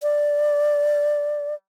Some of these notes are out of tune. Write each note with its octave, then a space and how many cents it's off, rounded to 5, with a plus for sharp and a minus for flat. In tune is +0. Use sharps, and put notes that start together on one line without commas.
D5 +0